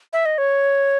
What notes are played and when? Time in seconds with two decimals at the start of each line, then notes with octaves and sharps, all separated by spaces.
0.13 E5
0.26 D#5
0.38 C#5